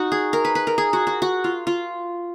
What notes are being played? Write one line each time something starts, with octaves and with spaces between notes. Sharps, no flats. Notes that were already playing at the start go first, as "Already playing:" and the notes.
Already playing: D#4 F#4
G#4
A#4
B4
B4
A#4
G#4
F#4
F#4
F#4
F4
F4